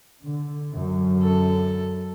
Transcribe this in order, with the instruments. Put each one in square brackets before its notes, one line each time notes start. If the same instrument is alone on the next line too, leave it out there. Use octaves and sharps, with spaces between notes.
[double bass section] D3
F#2 D3
[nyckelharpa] A4